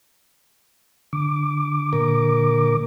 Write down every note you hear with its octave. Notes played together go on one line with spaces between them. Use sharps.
D3 D6
A#2 A#4